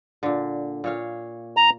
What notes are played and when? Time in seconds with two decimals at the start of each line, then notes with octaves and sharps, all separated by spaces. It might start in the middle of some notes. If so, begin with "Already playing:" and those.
0.23 A#2 D3
0.84 A#2 C#5 F5
1.57 A#5